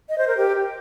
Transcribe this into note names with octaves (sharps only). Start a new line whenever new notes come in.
D#5
C5
A#4
G4